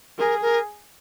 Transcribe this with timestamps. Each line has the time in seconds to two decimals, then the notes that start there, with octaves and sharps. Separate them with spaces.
0.18 G#4 A#4
0.41 A#4